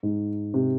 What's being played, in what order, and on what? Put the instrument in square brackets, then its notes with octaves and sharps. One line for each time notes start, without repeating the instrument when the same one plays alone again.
[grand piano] G#2
C3